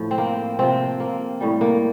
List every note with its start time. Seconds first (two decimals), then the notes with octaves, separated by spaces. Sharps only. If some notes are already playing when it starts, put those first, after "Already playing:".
Already playing: A2 F3
0.11 C4
0.18 A#3
0.59 C3 F3 C4
1.00 A#3
1.40 A2 G3
1.61 A#3